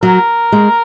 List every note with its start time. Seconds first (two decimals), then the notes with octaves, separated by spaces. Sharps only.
0.03 F#3 A#4
0.52 G#3